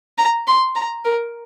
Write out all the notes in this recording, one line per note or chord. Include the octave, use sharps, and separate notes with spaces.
A#5
C6
A#5
A#4